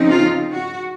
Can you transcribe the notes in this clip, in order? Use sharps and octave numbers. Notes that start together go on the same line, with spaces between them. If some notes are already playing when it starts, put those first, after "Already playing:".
Already playing: C#3 F3 C4 D#4
F4
F#4